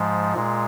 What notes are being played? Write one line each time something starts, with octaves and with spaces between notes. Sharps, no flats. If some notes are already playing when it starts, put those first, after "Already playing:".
Already playing: G#2 F3 G#3
A#2 G#3